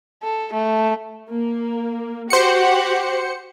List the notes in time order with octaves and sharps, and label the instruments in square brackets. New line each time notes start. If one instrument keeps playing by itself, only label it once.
[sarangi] A4
A3
[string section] A#3
[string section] F#4 G4 F#5 [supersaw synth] C5 C#7